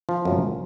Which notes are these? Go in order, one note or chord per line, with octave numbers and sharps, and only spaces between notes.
F3
F#2